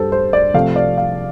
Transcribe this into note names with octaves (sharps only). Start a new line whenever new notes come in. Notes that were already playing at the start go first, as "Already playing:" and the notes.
Already playing: G2 G3 G4 A4 C5
C5
D5
C3 F3 A3 F5
D5
F5